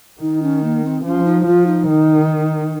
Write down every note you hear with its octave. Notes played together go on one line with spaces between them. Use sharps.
D#3 D#4
C#4
A#3
C4
F3 C#4
D#4
F3 F4
D#4
D#3